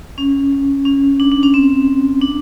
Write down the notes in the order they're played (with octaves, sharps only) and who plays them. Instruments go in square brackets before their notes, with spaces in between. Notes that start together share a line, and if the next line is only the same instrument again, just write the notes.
[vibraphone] C#4
C#4
D4
D4
C#4
C4
D4